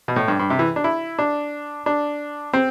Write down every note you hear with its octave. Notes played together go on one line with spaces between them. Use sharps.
B2
A2
G2
G2
C3
E3
D4
E4
D4
D4
C4